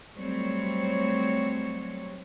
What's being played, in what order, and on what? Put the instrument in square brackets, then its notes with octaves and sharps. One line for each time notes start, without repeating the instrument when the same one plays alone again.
[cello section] F#3 G3 A3 C4 C#5